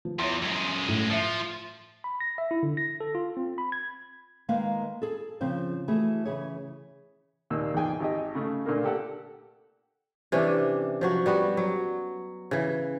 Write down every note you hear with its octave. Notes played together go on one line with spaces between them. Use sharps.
F3
E2 C#5 C6
F#2 G#3
A2
F3 E5 C7 C#7
B5
A#6
E5
E4
D3
A#6
A4
F4
C4
B5
G#6
D#3 G#3 A#3 B4 F5
G#4 A4
C#3 F3 C4 F4 C5
E3 A3 F#4 G#4
C#3 E3 G#4 C#5
D#2 A#2 E6
E2 G#2 G#4 G5 G#5
G#1 G4 G#4 D#5
C#3 A3
A#2 D3 A3 A#3
G4 A4 F#5
C3 E3 C#4 D4
F3 F#3 F#4
G3 B3 F#4
F#3
C#3 E3